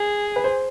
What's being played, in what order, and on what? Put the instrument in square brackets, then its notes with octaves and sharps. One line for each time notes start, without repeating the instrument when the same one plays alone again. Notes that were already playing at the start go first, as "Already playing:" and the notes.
Already playing: [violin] G#4
[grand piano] B4
C5